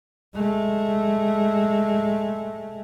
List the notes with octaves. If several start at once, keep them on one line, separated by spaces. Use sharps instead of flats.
G#3 A3